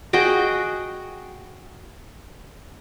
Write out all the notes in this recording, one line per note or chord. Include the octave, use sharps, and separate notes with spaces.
F#4 G#4 D#5 G5